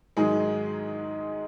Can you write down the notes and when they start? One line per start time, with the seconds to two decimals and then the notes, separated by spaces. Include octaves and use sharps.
0.17 G#2 D#3 F#3 G#3 G#4